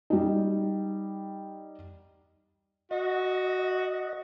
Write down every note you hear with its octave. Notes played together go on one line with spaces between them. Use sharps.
G3 D#4
F#4 D#5